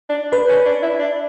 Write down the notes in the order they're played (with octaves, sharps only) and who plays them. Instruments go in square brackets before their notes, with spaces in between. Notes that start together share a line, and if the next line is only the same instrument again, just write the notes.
[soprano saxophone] D4
[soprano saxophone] D4 [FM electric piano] B4
[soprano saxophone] C#4
D4
E4
D4